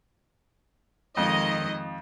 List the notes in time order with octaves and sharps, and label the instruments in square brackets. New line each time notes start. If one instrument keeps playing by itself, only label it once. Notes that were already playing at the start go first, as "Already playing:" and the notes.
[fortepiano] F2 [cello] D#3 G#3 [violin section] D#5